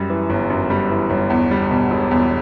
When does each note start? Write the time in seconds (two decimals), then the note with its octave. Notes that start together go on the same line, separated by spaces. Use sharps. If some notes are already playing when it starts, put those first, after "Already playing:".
Already playing: F#2 G3
0.09 E3
0.30 G1
0.50 F#2
0.70 G3
0.90 E3
1.10 G1
1.30 E2
1.51 G3
1.71 B2
1.91 E1
2.11 E2